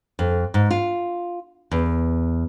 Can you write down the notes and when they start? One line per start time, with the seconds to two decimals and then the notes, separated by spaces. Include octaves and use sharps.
0.19 F2
0.54 G#2
0.71 F4
1.71 E2